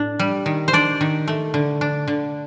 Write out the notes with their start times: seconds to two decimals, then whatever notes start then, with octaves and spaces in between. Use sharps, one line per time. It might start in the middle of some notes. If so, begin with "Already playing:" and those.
Already playing: A2 D4
0.19 G3
0.46 D#3
0.68 C5
0.73 D4 D5
1.01 D#3
1.28 A3
1.54 D3
1.81 D4
2.08 D3